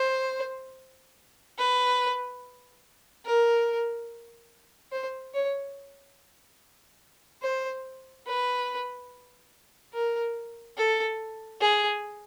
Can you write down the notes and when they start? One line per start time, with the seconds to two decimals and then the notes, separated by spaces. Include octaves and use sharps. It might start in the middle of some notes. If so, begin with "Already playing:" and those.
Already playing: C5
1.58 B4
3.26 A#4
4.92 C5
5.34 C#5
7.43 C5
8.27 B4
9.94 A#4
10.77 A4
11.61 G#4